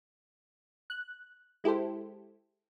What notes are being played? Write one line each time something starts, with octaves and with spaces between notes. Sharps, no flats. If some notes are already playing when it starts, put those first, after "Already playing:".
F#6
G#3 E4 G4 A4 C5